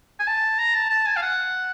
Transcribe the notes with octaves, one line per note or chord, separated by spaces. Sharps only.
G#5
A5
A#5
A5
A5
G#5
F5
F#5